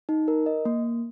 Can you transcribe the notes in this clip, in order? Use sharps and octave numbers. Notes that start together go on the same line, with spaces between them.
D#4
A#4
D#5
A#3